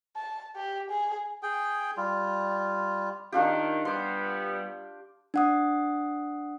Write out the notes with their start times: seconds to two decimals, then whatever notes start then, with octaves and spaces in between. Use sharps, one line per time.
0.16 A5
0.56 G4
0.90 G#4
1.43 G#4 G5
1.97 G3 F4
3.32 D#3 D4 F4 G4
3.85 G3 B3 C6 D6
5.34 D4 F#5 D#6